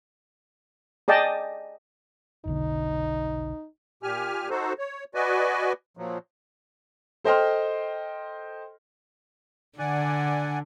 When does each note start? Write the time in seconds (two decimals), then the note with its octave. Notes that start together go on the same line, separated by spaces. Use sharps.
1.08 G#4 D5 D#5 G5 A5
2.45 F1 B1 D3 D#4
4.03 A#2 G4 G#5 F6
4.50 D#4 F#4 A4 C5
4.78 C#5
5.15 F#4 B4 D5 D#5 G#5
5.97 A#2 F3 F#3
7.24 A4 C5 D#5 G5 C6 F6
9.79 D3 D5 F#5 G#5